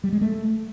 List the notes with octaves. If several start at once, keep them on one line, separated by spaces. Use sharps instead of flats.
G3
G#3
A3